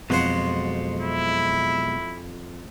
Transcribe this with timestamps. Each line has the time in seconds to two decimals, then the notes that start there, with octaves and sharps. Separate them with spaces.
0.10 F2 B2 F#3 G#3 C5 F#5
1.01 E4